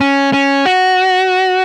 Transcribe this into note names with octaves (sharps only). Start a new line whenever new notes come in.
C#4
C#4
F#4